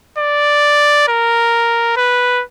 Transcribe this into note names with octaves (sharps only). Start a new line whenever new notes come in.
D5
A#4
B4